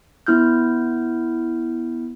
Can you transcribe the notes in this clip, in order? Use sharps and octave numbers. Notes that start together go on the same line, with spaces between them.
B3 E4 F6 G6